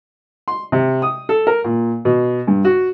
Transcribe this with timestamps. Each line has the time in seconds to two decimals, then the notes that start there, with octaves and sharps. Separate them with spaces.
0.48 C6
0.72 C3
1.02 D#6
1.29 A4
1.47 A#4
1.64 A#2
2.05 B2
2.47 G2
2.65 F#4